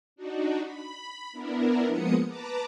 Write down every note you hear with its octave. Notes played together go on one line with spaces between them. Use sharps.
D4 D#4 F#4
B5
B3 D4 E4 A#4
F3 G#3 A#3 B3 D#6 C#7
B4 A5 A#5 D6